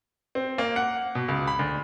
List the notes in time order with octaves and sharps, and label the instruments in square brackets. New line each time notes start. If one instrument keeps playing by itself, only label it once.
[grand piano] C4
A#3
F#5
B2
C#2
B5
D2